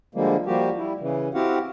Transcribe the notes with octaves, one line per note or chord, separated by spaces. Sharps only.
D3 F3 G3 G#3 A#3
F3 G3 A#3 F#4 G4
G3 E4
C#3 E3
C4 E4 F#4 G4 F5 F#5